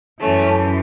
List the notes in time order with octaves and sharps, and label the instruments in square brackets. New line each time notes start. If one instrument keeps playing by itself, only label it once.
[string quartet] F#2 E3 A3 C#4